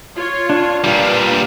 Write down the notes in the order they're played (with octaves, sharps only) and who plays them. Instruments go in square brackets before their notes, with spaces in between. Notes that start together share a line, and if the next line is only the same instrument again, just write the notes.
[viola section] F4 C#5
[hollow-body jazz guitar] D4
[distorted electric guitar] A#2 G3 [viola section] F4 B4 F5